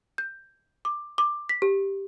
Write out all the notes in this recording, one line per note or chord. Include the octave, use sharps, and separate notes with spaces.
G6
D6
D6
B6
G4